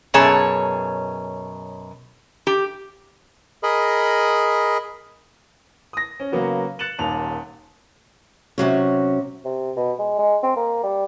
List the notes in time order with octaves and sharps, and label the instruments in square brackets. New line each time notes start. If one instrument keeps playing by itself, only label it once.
[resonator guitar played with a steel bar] F#2 B2 G#4 C#5 A5
G4
[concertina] G#4 A#4 D#5 B5
[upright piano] D#6 A#6
C#4
C#3 F#3 A#3 B3 F#4
F#6 A6 C#7 E7 F#7
D#1 D#2 F7
[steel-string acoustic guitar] C3 F#3 C#4
[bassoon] C3
B2
G#3
G#3
C4
A#3
G3